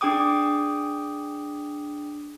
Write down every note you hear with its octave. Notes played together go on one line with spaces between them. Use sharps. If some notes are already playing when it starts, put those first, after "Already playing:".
D4 G#4 G5 D6 D#6